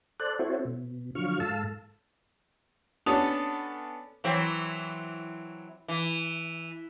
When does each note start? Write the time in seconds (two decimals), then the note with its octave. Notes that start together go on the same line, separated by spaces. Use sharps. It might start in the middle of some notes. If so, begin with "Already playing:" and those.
0.20 A4 C5 D5 F#6
0.39 C4 E4 F#4 A4 C5 C#5
0.65 B2
1.15 D3 F3 F#3 F4 C#6 F6
1.40 G#2 A4 F5 A5 E6
3.06 B3 C#4 D4 A4
4.24 E3 F#3 C4
5.88 E3